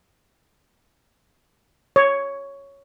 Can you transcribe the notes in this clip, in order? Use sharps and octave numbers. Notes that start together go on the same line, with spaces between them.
C#5